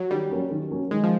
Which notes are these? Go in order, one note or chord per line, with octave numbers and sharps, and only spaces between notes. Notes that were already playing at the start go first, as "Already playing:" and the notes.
Already playing: F#3
D#3 G3
F#3 A#3 C#4
D#3
F#3 A#3 C#4
D#3 G#3
F3